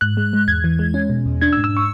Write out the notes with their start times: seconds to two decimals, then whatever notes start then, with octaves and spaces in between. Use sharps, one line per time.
0.01 G#2 F#6
0.17 G#3
0.33 G#3
0.48 E2 G#6
0.64 E3
0.79 G#3
0.94 C#4
1.10 B2
1.26 E2
1.41 D4 G#6
1.53 E6
1.57 G#2
1.64 E6
1.77 C#6